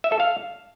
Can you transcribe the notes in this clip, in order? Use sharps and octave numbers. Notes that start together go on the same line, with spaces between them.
E5
A4
F5